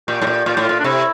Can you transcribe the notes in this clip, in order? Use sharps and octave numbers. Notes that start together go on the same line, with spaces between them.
A#2 G4
A2
A#2
A#2 F4
G4
A2 F4
A#2
D4
C3 E4